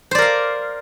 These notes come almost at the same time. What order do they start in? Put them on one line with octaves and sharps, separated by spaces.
C5 D5 A#4 F5